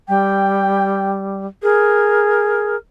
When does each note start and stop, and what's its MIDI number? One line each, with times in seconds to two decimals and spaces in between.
0.08 1.46 55
0.08 1.11 79
1.63 2.75 68
1.63 2.76 70